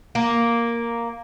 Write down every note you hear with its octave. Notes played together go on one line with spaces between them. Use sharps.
A#3